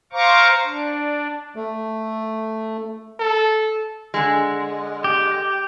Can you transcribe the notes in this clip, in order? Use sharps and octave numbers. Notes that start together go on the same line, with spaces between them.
C5 F5 A#5 C#6 D6
D4
A3
A4
D3 G#3
G4